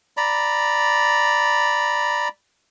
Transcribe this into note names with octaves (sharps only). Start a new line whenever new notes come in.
D5 A#5 B5